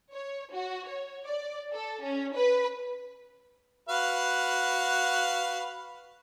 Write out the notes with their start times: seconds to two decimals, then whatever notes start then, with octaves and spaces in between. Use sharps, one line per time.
0.13 C#5
0.52 F#4
0.87 C#5
1.24 D5
1.73 A4
2.02 C#4
2.36 B4
3.89 F#4 B4 F5